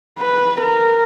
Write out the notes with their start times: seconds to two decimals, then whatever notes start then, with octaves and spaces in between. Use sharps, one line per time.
0.19 B4
0.60 A#4